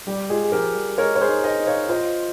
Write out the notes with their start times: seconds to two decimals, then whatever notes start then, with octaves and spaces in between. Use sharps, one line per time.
0.07 G3 G4
0.30 G#3 F4 G#4
0.44 G#4
0.52 F3 G4 A#4
0.75 G3
0.98 G#3 A#4 C#5
1.15 C#5
1.21 G#4 C5
1.29 D#4
1.43 C5 D#5
1.60 D#4
1.66 C#5 F5
1.89 F4 C5 D#5